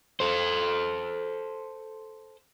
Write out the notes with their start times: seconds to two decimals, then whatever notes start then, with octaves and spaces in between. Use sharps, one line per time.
0.20 A4 C5